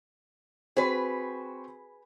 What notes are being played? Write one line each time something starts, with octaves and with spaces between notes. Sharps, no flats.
C4 F#4 G#4 B4 C5